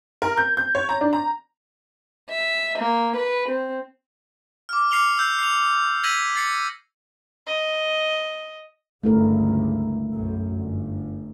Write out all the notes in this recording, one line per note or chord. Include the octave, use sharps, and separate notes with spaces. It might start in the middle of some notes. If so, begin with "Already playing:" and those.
A#4
G6
G6
C#5
A#5
D4
A#5
E5
A#3
B4
C4
D6 F6
D6 F6 C7 C#7 F7 G7
E6 G6 C7
C7 F7
E6 G#6 A#6 B6 D#7 F#7
A6 C7 C#7
D#5
G1 C#2 A3 E4 A#4
B1 F#2
G1